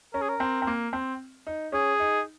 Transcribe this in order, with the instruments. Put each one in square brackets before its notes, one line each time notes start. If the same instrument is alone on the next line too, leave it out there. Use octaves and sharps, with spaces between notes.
[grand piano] C#4 [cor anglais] A#4
[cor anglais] G#4
A#4
[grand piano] C4
C4
A#3
C4
D#4
[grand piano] C#4 [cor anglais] G#4
[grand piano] D#4